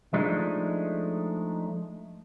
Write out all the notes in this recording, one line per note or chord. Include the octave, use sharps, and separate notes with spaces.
F3 G#3 A3 D4 D#4